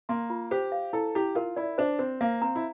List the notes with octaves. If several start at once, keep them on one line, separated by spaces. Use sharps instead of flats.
A#3 C6
F4
G4 C5
F5
E4 A4
E4 G4
F4 A#4
E4 D5
D4 C5
C4 C5
A#3 F5
C4 A#5
E4